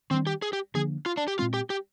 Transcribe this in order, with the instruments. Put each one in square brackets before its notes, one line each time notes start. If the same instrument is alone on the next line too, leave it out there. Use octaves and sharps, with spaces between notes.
[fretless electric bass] D#3 G3 D4 [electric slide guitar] C4
[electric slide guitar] G4
G#4
G4
[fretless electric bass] D3 F3 A#3 D4 [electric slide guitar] G#4
[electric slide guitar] F4
D4
G4
[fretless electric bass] A#2 G#3 C4 [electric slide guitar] F4
[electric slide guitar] G4
G4